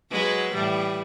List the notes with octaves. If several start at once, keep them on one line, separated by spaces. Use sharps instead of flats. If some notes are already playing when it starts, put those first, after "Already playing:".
F#3 G#3 B4
A2 E3 G3